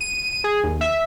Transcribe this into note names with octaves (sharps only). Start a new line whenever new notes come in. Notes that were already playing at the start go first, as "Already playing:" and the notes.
D#7
G#4
D#2
E5